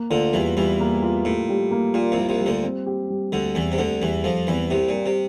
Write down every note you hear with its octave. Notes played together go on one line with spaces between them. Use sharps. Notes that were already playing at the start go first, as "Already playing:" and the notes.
Already playing: A#3
D2 D3 F4
E2 E3 G3
E2 E3 G3
A#3
F4
A2 G3
G3
A#3
A#2 F4
C2 C3
G3
C2 C3
G3
D2 D3
C4
G4
G3
D2 D3 G3
E2 E3 C4
C3
D2 D3 G4
E2 E3 G3
F2 F3 G3
E2 E3 C4
C2 C3 G4
A#2 G3
C3